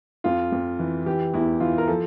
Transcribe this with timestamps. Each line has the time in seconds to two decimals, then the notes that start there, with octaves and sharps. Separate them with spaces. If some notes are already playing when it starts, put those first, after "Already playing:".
0.24 F2 F4
0.52 F2
0.79 E3
1.06 E3 G4
1.34 E2 E4
1.60 E3 F4
1.78 A#4
1.88 F3 A4